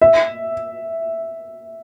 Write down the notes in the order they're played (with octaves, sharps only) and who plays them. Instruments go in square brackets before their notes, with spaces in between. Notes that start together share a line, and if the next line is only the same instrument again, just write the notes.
[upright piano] E5